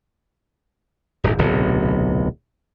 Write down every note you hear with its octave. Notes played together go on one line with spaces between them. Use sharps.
D#1 G#1 E2
D1 B1 C3